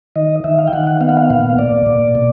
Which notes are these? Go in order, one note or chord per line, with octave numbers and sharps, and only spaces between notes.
D#3 D#5
D#3 E5
F5
G5
D#3 F#5
F#5
B3 F5
F#5
F5
A#2 F5
A#2 D5
A#2
B2